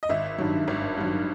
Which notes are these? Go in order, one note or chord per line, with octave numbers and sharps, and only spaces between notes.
D#5
G#1 E5
G2 D#3 F#3
G#1
G2 D#3 F#3